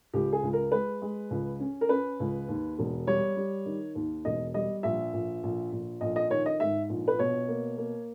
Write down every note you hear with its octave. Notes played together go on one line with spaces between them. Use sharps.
C#2 G4
G#4
C#2
A#4
G#3 B4
G#3
C#2
C#4
A#4
C#4 B4
C#2
D#2
E1
G3 C#5
G3
D#3
D#2
E1 D#5
G3 D#5
A#1 E5
A#1
A#1
A#1
A#1 D#5
D#5
D#3 C#5
D#5
G#2 E5
A#1
B4
B2 C#5
A#3
A#3